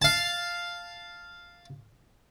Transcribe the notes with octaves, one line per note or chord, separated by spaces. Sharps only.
F5 A5